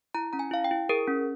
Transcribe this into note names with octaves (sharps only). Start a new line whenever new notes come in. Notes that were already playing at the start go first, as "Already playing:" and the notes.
E4 A#5
C#4 A#5
G#5
E4 F5
G5
E4
G#4 A#4
C#4